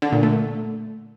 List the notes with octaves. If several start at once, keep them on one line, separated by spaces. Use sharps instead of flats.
D3
A#2
A3